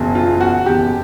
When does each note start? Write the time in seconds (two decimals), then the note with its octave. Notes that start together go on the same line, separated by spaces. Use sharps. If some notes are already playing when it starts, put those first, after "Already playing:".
Already playing: F#1 E2 B2
0.15 F4
0.41 F#4
0.66 F#1 E2 B2 G4